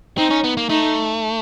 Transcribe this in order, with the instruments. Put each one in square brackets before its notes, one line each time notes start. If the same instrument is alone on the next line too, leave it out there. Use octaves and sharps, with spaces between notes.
[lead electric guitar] C4 [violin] D#4
[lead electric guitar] C#4
B3
A#3
[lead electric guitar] A3 [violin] D#4